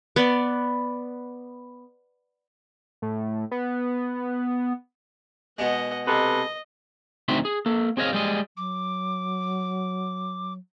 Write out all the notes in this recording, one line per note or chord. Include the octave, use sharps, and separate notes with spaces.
B3 D5
A2
B3
B2 G#3 D#5 F#5
C3 A4 B4 D#5
D2 C4 D#4 F#4 E5 C6
G#4
A#3 A4
C4 G#4 C#5 D#5 F5
G3 G#3 D#5
F#3 D6